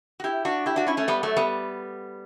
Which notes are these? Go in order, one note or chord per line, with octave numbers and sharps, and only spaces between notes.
F#4
E4 G4
D4 F#4
E4 G4
D4 F#4
C#4 E4
A3 C#4
G3 B3
F#3 A3
G3 B3